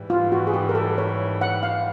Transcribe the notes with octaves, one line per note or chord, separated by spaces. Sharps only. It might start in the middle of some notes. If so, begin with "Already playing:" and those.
Already playing: G#2 E3 G3
F4
F#4
G#4
G4
A#4
A4
C#5
F#5
F5